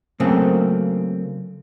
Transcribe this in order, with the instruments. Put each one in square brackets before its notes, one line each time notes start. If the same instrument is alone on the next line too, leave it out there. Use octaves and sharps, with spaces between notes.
[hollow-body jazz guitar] C#3 F#3 A3 A#3 C4